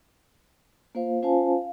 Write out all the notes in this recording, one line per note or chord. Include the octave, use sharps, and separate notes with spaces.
A#3 F4 C5 F5
C#4 F4 C5 F5 G#5 A5
F5